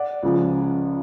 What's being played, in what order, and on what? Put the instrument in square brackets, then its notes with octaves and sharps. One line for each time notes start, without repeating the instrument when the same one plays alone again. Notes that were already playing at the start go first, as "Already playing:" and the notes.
Already playing: [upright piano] D5 F#5
C#2 C#3 F3